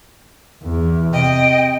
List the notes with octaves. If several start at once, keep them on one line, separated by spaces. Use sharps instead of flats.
E2
C3 D#5 G5